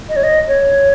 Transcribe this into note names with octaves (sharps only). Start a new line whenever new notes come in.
D#5
C#5
D#5
C#5